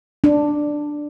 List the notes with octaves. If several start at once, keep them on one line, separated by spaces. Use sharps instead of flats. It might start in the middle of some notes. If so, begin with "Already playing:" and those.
D4